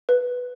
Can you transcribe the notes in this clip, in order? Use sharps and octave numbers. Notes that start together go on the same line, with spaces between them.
B4